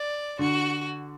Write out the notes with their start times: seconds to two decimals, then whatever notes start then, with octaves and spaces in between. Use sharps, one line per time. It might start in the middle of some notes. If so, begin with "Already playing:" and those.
Already playing: D5
0.39 D3 F#4